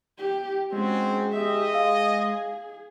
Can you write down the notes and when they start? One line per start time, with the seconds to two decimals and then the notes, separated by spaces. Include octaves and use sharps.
0.18 G4
0.72 G#3 C4 C#4 F#4
1.32 G4 D#5 E5
1.74 G#4 F5